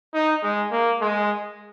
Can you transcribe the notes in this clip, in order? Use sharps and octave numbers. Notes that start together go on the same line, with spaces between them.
D#4
G#3
A#3
G#3